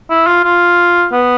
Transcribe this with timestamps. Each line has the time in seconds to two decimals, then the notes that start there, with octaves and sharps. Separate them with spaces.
0.10 E4
0.26 F4
0.44 F4
1.12 B3